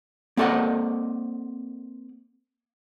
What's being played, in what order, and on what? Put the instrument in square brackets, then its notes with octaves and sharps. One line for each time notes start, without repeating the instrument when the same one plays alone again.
[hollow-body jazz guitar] A#3 C4 A4 D5 D#5 F#5